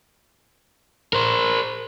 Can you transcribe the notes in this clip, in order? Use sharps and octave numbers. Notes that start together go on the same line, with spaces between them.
A#4 C5